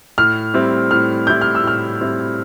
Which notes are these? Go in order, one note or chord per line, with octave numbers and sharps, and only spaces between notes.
A2 F6
G3 C4 E4
A2 F6
G3 C4 E4 G6
F6
E6
A2 F6
G3 C4 E4